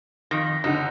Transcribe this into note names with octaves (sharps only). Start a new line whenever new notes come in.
F2 D#3 A#6
F#1 D3 D#4 F#5